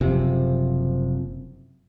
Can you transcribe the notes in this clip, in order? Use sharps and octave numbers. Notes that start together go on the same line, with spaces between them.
F#1 C3 F3